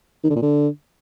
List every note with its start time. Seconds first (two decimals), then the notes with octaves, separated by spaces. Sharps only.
0.24 D#3
0.30 D3
0.36 A#2
0.42 D3